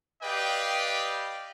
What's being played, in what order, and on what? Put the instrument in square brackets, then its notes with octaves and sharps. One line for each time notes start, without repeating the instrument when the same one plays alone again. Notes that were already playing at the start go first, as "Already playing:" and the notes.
[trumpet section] G4 B4 D5 D#5 F5 G5